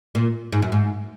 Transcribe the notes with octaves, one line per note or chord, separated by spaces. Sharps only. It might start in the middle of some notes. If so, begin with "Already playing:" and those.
A#2
G#2
F#2
G#2